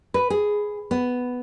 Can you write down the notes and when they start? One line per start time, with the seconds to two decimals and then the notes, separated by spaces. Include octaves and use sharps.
0.14 B4
0.30 G#4
0.91 B3